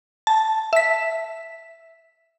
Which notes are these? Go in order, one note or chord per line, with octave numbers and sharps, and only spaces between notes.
A5
E5 B6